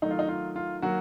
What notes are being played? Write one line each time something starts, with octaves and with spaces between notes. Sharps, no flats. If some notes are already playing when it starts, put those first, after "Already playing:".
D#3 F#3 A3 D#4
F4
D#4
F4
F4
D#3 F#3 A#3 F#4